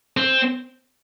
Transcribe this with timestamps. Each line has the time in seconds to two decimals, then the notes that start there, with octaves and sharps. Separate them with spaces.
0.17 C4